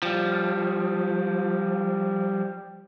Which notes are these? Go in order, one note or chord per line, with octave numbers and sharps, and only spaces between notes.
F3 G3